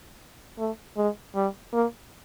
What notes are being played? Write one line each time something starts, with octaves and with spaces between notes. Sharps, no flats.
A3
G#3
G3
A#3